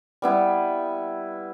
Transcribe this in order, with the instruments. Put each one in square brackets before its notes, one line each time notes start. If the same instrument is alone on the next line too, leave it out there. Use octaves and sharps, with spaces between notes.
[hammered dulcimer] G3 B3 E4